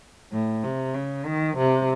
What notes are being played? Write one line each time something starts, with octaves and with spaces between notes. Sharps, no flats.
A2
C3
C#3
D#3
C3